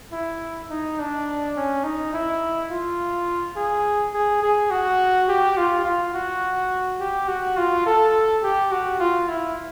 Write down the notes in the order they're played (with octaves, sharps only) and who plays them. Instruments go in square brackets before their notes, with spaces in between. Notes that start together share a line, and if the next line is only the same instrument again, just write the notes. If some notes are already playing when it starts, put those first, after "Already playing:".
[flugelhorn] E4
D#4
D4
C#4
D#4
E4
F4
G#4
G#4
G#4
F#4
G4
F4
F4
F#4
G4
F#4
F4
A4
G4
F#4
F4
E4